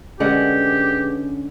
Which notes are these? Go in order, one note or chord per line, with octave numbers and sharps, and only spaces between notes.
D3 G#3 C#4 G4 G#4 B4 F#5